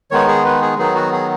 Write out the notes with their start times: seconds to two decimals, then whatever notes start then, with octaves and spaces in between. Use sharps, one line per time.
0.11 D#3 G#3 B3 D#4 C#5
0.28 G#4
0.45 B4
0.62 G#4
0.78 D#3 F#3 B3 D#4 G#4
0.95 F#4
1.12 G#4